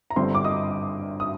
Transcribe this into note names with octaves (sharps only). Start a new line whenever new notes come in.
A#5
G1 G2 D3 G3 C4 C5 C6
D6
D#5 D#6
D#6